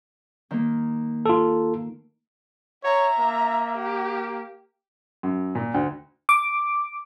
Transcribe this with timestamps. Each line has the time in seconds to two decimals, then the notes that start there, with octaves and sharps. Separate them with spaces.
0.51 D#3 A#3
1.26 F4 A4
2.84 C#5 E5 A#5
3.19 A#3
3.77 G4
5.23 F#2
5.55 A#2
5.74 D2
6.29 D6